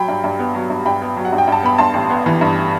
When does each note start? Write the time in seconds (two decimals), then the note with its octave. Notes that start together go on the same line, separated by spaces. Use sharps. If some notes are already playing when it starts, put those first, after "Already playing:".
Already playing: F#3 G5 B5
0.08 G2
0.24 G2
0.39 B3
0.55 F#3
0.70 G2
0.85 G2 G5 B5
1.02 B3
1.17 F#3
1.25 F#5
1.33 G2
1.38 G5
1.48 G2 A5
1.63 B3 B5
1.78 G2 A5 C6
1.94 A1
2.10 B3
2.26 E3
2.41 G2